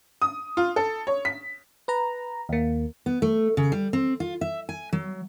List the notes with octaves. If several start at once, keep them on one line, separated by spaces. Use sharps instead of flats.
D#6
F4
A4
C#5
B6
B4 A#5
D#2 A#3
B3
A3
C#3
G3
C4
F4
E5
G#5
F#3